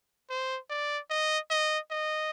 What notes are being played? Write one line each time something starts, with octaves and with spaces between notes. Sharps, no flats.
C5
D5
D#5
D#5
D#5